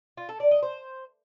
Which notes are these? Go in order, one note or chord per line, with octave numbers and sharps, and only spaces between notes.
F4
A4
D5
D#5
C5